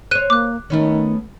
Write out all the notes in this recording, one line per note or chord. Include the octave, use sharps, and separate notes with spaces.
C5 C#5 F#6 D#7
A#3 D6 F#6
D#3 A3 B3 C#4